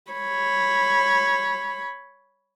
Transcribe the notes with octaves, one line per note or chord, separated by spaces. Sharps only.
C#5 B5